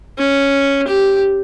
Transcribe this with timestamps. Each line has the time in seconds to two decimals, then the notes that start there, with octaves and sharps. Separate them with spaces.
0.18 C#4
0.88 G4